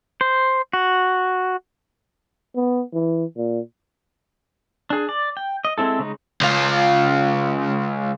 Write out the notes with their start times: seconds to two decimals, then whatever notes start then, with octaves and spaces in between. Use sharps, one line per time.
0.21 C5
0.73 F#4
2.55 B3
2.93 E3
3.36 A#2
4.90 D4 G#4
5.09 D5
5.37 G5
5.65 D#5
5.78 G#3 C4 E4 A4
5.99 C#3 G#3 D#4
6.41 C#2 F4